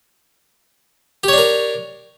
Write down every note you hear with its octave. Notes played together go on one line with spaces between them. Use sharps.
D4 G4 A#4 C#5